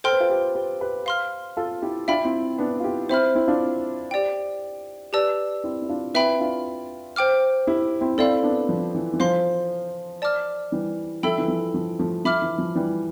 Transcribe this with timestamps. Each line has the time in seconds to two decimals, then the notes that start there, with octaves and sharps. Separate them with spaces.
0.04 A4 C5 G5 C6 F6
0.12 B4
0.20 F4 A4
0.30 G4 B4
0.55 G4 B4
0.81 G4 B4
1.06 F5 C6 F6
1.57 F4 A4
1.82 E4 G4
2.08 D4 F4 E5 G5 B5
2.24 C4 E4
2.58 B3 D4
2.80 F4
2.84 E4 G4
3.09 C4 E4 C5 E5 B5 F6
3.35 C4 E4
3.47 D4 F4
4.11 G4 D5 G5
5.13 G4 B4 D5 A5 E6
5.64 C4 E4
5.82 E4
5.89 D4 F4
6.14 C4 E4 B4 E5 G5 B5
6.40 D4 F4
7.16 C5 G5 D6 F6
7.67 E4 G4
8.01 C4 E4
8.18 C4 E4 A4 D5 F5 B5
8.43 B3 D4
8.69 F3
8.95 E3
9.13 E3
9.20 F3 C5 F5 C6
10.22 D5 A5 D6 F6
10.72 E3 G3
11.23 F3 A4 E5 G5 B5 E6
11.38 E3
11.48 F3
11.74 F3
11.99 F3 A3
12.25 F3 E5 B5 D6 F6
12.42 E3
12.58 F3
12.75 E3 G3